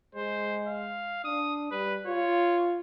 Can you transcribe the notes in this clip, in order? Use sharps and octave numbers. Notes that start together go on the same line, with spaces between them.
G#3 C5
F5
D4 D#6
G3 B4
F4 C#5